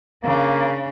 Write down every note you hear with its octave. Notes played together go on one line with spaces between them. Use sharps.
C#3 A#3 D4